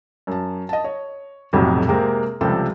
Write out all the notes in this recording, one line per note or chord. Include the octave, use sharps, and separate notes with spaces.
F#2 A5
D#5 A5
C#5
B1 F2 A2 C3 F#3
C3 G#3 A#3 C4 A#4
C#2 C3 F3 G3 C4 A4